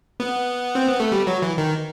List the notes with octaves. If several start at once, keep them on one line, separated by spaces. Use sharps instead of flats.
B3
C4
B3
A3
G3
F#3
E3
D#3